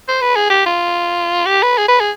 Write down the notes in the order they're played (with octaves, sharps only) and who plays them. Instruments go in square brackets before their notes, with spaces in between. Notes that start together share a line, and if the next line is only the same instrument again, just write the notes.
[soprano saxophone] C5
B4
G#4
G4
F4
G4
B4
G#4
B4
G#4